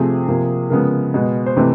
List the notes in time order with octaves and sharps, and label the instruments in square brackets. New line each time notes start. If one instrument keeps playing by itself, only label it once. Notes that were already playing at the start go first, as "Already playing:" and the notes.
Already playing: [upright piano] C3 F3 A3 C4 G#4
C3 F3 A#3
C#3 F3 G#3 B3 A#4
B2 G#3 B3
C5
C3 E3 A3 C4 B4